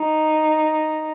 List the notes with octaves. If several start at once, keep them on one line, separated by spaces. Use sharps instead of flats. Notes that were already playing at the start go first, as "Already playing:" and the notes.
Already playing: D#4